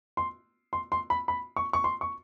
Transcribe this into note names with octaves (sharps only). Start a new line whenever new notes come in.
C6
C6
C6
B5
B5
C#6
C#6
C6
C#6